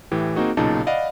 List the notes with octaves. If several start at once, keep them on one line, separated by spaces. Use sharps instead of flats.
A2 E3 G4
A#3 C4 D#4 F#4 G#4
B1 A#2 C#3 D#4 A5
D5 D#5 F5 F#5 B5